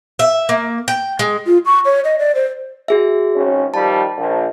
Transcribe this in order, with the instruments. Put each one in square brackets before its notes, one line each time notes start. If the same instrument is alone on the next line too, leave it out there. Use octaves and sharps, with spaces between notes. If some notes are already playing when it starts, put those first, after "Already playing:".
[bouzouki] E5
A#3
G5
G#3
[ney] F4
C#6
C#5
D#5
D5
C5
[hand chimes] F#4 G#4 E5
[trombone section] G#1 C#4
[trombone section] D#3 F3 G3 [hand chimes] A5
[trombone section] A#1